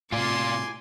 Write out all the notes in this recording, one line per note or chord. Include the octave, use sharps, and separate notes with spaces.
A2 C3 F4 D5 G#5 C6 D6